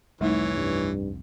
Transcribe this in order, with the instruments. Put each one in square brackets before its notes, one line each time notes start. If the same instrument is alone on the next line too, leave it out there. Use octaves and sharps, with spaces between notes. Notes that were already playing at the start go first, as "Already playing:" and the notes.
[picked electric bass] F1 C2 [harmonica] E3 C#5 [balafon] G3 A3 D#4
[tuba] G2